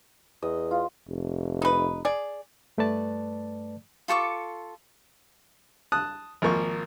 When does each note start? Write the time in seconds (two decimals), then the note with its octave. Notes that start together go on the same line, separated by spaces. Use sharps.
0.42 E2 D#5
0.71 F4
1.07 F1
1.62 D#4 B4
2.05 G#4 D5
2.78 G2 A3 B4 D5 A5
4.08 F4 A4 C#6 D6
5.92 A5 D#6 F#6
6.42 G#1 F3 A#3 C#6